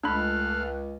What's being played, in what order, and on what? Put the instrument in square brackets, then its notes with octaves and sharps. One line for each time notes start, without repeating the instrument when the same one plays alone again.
[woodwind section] C#2 [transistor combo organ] A3 F5 [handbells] D4 B5 [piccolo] F#6